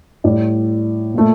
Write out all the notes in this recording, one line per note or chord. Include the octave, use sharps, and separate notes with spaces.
A2 G3 D5
A#2 A3